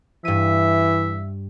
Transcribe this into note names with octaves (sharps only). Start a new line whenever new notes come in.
G2 E3 E5 D#7